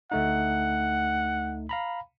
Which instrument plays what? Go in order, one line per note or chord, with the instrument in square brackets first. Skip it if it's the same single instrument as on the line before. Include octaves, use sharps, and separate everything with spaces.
[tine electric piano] D2 A3 D#4 [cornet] F#5
[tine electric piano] F5 A#5 B5